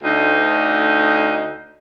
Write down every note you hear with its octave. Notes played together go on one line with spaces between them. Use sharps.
D2 D#4